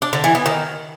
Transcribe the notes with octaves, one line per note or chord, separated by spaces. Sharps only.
D4
D3
E3
B3
D#3